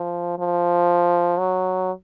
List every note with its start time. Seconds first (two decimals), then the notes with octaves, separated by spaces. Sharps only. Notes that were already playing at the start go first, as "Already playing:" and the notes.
Already playing: F3
0.39 F3
1.39 F#3